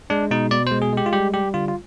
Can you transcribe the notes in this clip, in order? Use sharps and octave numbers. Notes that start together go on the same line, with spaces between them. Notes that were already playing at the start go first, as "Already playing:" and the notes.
G#3 D4
B2 D#4
B2 D5
G#3 C5
G#4
G#3 G4
F4
G3 G4
G3 G4
D3 F4
F4